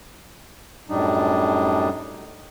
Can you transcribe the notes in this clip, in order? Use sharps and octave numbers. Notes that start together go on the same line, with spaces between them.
F#2 A2 G3 D4 D#4